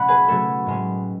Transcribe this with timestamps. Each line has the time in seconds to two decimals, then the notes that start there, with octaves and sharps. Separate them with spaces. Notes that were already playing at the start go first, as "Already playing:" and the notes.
Already playing: B2 F#3 A3 C#4 F#5 B5
0.08 G#4 B4
0.28 B2 F#3 A3 C#4 A4
0.66 A2 G#3 C#4